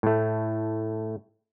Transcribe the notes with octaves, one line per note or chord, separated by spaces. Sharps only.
A2 A3